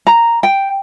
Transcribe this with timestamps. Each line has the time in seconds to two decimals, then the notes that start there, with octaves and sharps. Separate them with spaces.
0.07 A#5
0.43 G5